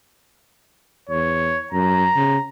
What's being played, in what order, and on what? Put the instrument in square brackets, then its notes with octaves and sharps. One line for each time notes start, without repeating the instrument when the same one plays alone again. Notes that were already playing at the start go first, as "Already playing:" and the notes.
[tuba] E2 [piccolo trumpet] C#5
[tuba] F#2 [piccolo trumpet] A#5
[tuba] C#3